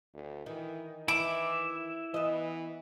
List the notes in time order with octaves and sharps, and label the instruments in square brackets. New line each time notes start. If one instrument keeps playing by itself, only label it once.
[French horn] D2
[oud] D#3 [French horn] E3
[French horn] E3 [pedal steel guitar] E4 E5 [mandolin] D6
[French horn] E3 [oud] B3 D#5